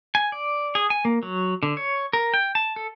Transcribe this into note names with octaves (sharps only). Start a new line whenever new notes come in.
G#5
D5
G#4
G#5
A#3
F#3
D3
C#5
A#4
G5
A5
A4